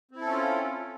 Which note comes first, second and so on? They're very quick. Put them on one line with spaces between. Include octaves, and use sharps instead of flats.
C4 E4 A4 C#4 F4